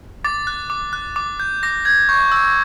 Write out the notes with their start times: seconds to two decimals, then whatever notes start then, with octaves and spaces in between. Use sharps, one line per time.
0.25 D6 A6
0.47 F#6
0.70 D6
0.93 F#6
1.16 D6
1.40 G6
1.63 D6 A#6
1.85 G6 G#6
2.09 C#6 G6
2.32 E6 G6